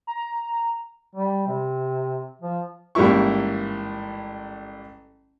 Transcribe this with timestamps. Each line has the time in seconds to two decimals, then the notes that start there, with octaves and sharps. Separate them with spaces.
0.07 A#5
1.15 G3
1.47 C3
2.42 F3
2.95 A1 G#2 G3 A#3 E4 C#6